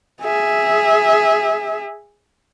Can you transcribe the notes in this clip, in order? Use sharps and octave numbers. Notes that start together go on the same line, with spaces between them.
G#4 E5